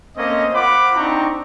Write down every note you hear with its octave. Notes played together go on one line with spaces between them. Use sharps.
A3 A#3 C4 C#4 D#5
F4 C5 F#5 B5 D6
C4 D4 D#4 G5 A#5 C#6